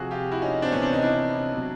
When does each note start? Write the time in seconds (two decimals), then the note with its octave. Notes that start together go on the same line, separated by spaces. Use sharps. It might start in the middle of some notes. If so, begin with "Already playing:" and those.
Already playing: C3 F3 F#4 G#4
0.11 F4 G4
0.31 E4 F#4
0.42 C#4 D#4
0.62 C4 D4
0.72 C3 E3 B3 C#4
0.82 C4 D4
0.93 C#4 D#4
1.03 D4 E4
1.54 B2 F#3